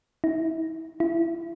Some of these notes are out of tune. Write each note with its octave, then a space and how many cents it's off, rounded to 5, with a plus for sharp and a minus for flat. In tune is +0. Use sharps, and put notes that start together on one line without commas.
E4 -30
E4 +25